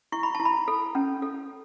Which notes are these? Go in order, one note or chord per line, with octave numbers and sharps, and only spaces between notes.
E4 C#6
B5
E4 A5
B5
A4
C#4
A4